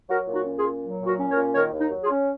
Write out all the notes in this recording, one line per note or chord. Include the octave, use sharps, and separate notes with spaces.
F#3 F#4 A#4
A#2
D#4 F#4
C#4
F4 G#4
A#2
F#3
A#2
F#4 A#4
C#4
A#4 C#5
A#2
D#3 A#4 C#5
D#2
D#4
F#3
F4 G#4
C#4